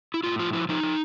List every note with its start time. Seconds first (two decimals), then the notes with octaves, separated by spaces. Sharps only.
0.14 E4
0.24 A2 F4
0.39 F3 F4
0.53 F3 E4
0.69 F3 D#4
0.83 F3